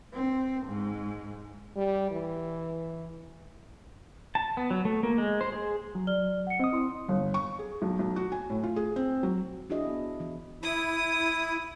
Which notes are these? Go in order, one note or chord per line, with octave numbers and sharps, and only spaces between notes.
C4
G#2
G3
E3
A5
B3
F#3
A3
A#3
G#3
C5
G#4
F#3
D5 F6 G7
F#5 C#7
C4 D#5 D#6
E4 C6
G1
C#6
G#4
B1
B1
F#4
G#5
A2
F4
G#4
C4
F#3
D4 E4 F#4 G#4 D#5
B3
E3
E4 D#6